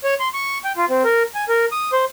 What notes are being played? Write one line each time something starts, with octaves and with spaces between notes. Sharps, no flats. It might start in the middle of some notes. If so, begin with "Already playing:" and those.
C#5
C6
C#6
G5
F4
C4
A#4
G#5
A#4
D#6
C5